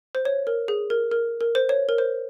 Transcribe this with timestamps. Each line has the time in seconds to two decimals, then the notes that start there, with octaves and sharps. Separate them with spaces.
0.15 C5
0.25 C#5
0.47 A#4
0.68 G#4
0.90 A#4
1.12 A#4
1.41 A#4
1.55 C5
1.69 C#5
1.89 A#4
1.98 C5